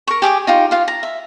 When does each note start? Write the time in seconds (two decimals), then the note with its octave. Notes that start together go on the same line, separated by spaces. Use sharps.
0.07 A#4 C#6
0.22 G4 G#4 D6 D#6
0.47 D#4 F4 G4
0.71 F4 F5
0.88 A#5
1.03 E5